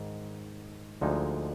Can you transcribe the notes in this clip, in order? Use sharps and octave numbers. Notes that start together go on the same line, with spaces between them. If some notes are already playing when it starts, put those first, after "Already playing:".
Already playing: G#2 D#3
D2 D3 F3 G#3 D#4